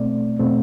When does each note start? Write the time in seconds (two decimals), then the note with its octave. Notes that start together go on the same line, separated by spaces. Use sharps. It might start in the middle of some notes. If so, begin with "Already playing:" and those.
Already playing: B2 A3 C4 D5
0.39 B2 A3 C4